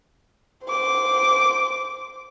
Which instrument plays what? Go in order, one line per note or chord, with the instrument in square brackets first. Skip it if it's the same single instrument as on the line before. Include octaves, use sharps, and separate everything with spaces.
[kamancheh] C5 D6